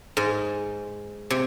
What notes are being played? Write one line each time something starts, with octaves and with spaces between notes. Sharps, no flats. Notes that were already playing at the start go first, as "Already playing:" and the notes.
G#2
C3